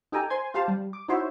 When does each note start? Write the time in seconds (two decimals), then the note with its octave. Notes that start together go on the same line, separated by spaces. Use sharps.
0.12 D#4 G4 A4 G5 G#5 A#5
0.30 C5 G#5 C6 G#6
0.54 F4 G4 C5 F5 A5
0.68 G3
0.93 D6
1.08 D#4 E4 F#4 C5 C#5 E5